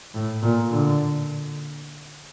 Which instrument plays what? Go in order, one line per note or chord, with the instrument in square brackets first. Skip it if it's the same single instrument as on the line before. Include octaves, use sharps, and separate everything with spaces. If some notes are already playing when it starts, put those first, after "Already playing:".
[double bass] A2
A#2
D3